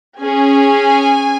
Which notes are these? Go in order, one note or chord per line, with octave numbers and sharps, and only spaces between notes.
C#4 G#4 G#5